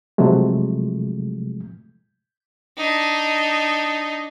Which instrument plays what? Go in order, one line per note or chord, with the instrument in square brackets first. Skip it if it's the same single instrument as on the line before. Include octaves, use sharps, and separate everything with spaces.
[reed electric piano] C3 F3 F#3 G#3 A3
[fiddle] D4 D#4